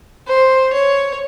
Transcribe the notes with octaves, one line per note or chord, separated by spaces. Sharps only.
C5
C#5